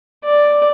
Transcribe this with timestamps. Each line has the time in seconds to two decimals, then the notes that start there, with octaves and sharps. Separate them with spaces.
0.24 D5